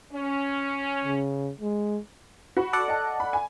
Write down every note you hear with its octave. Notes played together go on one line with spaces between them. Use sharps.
C#4
C#3
G#3
F#4 B5
A4 D5 F#5
D#5 A5
B5
G#5